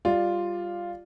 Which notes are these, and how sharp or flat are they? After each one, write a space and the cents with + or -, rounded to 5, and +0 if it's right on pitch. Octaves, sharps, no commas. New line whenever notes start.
G3 +0 F4 +0 D5 +10